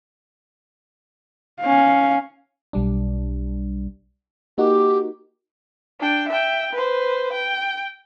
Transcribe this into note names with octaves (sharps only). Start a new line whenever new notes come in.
C#4 F5
B1 G3 D4
A#3 D#4 F#4 G4
D4 G5
E5 G5
B4 C5
G5